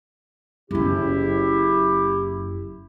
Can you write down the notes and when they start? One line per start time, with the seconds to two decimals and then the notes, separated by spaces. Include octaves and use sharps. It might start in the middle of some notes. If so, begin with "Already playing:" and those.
0.71 F#1 F#2 E4 G4